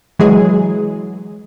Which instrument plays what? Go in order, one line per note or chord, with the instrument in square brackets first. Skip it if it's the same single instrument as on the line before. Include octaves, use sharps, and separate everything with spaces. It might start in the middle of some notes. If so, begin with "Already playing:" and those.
[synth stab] E3 F#3 G#3 G#4